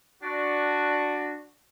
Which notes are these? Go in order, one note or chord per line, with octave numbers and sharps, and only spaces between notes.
D4 F#4